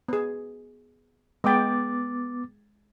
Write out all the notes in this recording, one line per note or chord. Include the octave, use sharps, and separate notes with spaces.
B3 G#4
G#3 B3 G5 D6 A6